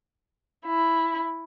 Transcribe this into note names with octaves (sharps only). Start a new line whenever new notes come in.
E4